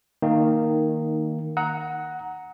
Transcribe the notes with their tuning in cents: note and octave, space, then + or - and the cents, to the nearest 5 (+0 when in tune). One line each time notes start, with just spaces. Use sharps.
D#3 +0 A#3 -10 D#4 -15
F#5 +0 A#5 +0 D#6 +45